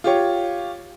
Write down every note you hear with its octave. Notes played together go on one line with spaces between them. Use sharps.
F4 G4 C#5